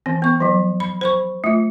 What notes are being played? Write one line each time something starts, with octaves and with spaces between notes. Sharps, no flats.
E3 C4
B3 C#6
F3 F#3
B5
C5 B5 C#6
A3 F4